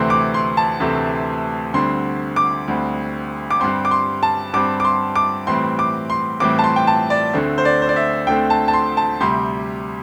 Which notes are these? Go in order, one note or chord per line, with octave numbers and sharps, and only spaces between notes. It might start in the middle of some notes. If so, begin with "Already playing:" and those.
Already playing: D2 C3 E3 A3 C4 C6
D6
C6
A5
D2 C3 E3 A3 C4
D2 D3 G3 C4 C6
D6
D2 D3 G3 C4
D6
G2 G3 C4 C6
D6
C6
A5
G2 G3 C4 D6
D6
C6
D6
A2 E3 G3 C4 C6
D6
C6
A2 E3 G3 C4 D6
A5
C6
G5
A5
D5
D2 D3 A3 C4
C5
D5
C5
D5
E5
D2 D3 A3 C4 G5
A5
A5
C6
A5
D2 C3 G3 C6